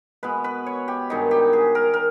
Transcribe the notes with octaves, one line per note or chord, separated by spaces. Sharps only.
B2 G#3 B4
B4
C#5
G4
G2 D#3 G#3 D#4
G4
G#4
A#4
A#4